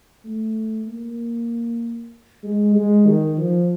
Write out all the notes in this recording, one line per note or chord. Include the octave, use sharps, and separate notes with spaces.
A3
A#3
G#3
G#3
D#3
F3